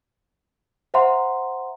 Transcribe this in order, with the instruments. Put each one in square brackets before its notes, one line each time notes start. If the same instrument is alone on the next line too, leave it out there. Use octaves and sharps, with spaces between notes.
[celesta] C5 E5 F#5 A#5 C6